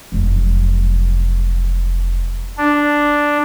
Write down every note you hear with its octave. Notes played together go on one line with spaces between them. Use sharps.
F1 F#3
D4